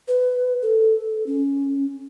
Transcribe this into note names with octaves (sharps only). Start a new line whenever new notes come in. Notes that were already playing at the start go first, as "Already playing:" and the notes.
B4
A4
C#4